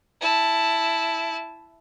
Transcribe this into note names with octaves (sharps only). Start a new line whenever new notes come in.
E4 A5